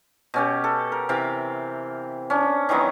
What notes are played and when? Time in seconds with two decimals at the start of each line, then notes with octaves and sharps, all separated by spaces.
0.34 B2 C#4 G4
0.64 A4
0.92 A#4
1.09 C3 E3 F5 G5
2.30 C#4 D4
2.69 D#3 E3 F#3 B3